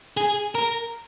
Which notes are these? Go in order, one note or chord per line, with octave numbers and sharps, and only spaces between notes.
G#4
A#4